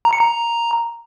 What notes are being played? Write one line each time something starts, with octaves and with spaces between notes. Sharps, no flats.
A#5
C#7
A#5